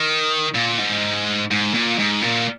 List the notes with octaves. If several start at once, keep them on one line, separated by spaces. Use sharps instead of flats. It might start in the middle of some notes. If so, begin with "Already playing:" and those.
Already playing: D#3
A#2
G#2
G#2
A#2
G#2
A#2